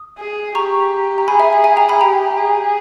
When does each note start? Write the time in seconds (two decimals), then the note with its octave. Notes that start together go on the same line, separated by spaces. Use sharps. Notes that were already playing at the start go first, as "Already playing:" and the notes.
Already playing: D#6
0.18 G#4
0.55 G4 A#5 C#6
1.18 A#5
1.28 G#4 G#5 B5
1.40 E5
1.53 E5
1.64 E5 G#5
1.76 G5 A#5
1.89 G#5 B5
2.01 G4 G5 A#5
2.37 G#4